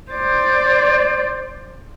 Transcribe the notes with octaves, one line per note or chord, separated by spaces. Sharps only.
C5 D5